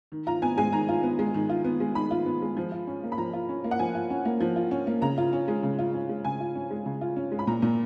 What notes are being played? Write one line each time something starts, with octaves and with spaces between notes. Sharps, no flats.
D#3
F4 A#5
B3 G#5
G#3 G#5
D#3 A#5
F4
B3
G#3
D#3
F4
B3
G#3
D#3 B5
F4
B3
G#3
F3
F4
C#4
A#3
B5
F3 A#5
F4
C#4
A#3
F#5
F3 G#5
F4
C#4
A#3
F3
F4
C#4
A#3
C#3 A#5
F4
C#4
G#3
C#3
F4
C#4
G#3
C#3 G#5
F4
C#4
G#3
C#3
F4
C#4
G#3
B5
A#2 A#5
A#2